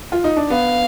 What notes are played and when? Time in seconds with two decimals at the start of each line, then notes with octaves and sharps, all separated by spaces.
0.12 F4
0.24 D#4
0.37 D4
0.50 B3 F5